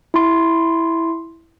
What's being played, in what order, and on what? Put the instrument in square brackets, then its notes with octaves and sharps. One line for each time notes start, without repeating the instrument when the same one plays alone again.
[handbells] E4 C6